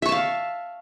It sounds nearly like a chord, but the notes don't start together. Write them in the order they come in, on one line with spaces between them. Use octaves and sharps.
E5 C#6 A5 F5